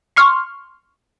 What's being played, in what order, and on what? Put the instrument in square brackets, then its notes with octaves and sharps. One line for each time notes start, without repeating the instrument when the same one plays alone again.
[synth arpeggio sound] C6 C#6 F6